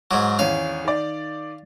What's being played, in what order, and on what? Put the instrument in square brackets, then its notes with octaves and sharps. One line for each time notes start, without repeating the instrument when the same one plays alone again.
[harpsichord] G#2 F#3 [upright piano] D6
[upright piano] G#1 E2 C#4 [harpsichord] F5
[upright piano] D#3 D5